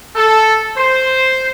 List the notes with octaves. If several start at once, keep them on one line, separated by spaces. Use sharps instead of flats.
A4
C5